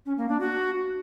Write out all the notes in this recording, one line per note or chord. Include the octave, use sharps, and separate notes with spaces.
C#4
A#3
D4
F#4